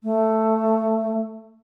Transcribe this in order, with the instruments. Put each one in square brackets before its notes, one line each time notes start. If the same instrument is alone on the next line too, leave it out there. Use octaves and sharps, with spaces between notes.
[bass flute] A3